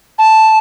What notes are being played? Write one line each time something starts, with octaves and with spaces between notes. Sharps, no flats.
A5